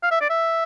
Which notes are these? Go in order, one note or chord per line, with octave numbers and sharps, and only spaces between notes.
F5
E5
D5
E5